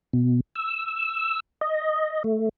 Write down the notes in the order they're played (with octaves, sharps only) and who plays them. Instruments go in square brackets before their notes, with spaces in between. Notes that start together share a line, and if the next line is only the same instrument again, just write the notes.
[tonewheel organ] B2
E6
D#5
A3